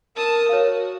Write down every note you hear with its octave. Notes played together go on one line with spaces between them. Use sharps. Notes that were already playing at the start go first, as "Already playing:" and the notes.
A#4 A5 D#6 E6
F#4 C#5 F5